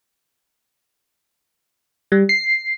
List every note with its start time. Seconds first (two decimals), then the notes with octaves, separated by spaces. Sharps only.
2.12 G3
2.29 C7